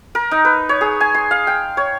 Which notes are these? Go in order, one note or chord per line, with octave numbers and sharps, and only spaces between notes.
A#4
D#4
B4
C#5
G#4
G#5
C6
F5
G5
C#5